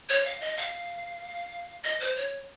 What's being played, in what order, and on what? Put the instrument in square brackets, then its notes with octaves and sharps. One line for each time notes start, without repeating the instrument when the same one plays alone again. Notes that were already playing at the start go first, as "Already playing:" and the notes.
[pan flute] C#5
F5
D#5
F5
D#5
C5
C#5